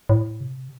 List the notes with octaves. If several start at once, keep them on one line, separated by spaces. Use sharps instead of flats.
A2
C3